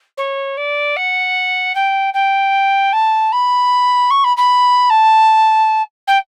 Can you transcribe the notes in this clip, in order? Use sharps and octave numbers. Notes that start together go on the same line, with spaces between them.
C#5
D5
F#5
G5
G5
A5
B5
C#6
B5
B5
A5
G5